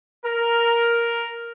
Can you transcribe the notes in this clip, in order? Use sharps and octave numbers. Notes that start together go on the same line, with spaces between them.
A#4